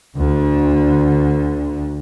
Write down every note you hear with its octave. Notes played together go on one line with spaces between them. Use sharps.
D2 D3